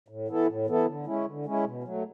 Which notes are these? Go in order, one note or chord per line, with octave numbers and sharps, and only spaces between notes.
A2
E3 B3 E4 A4
A2
E3 B3 E4 A4
D3
G#3 C#4 E4
D3
G#3 C#4 E4
B2
F#3 A3